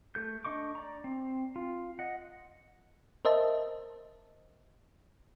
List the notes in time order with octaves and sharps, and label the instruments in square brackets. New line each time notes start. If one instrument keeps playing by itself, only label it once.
[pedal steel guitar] A3 A4 G6
D4 D#5 C#6 D6
D5 A#5
C4
F4
D#5 F#5
[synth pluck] A#4 C5 D#5 E5 A5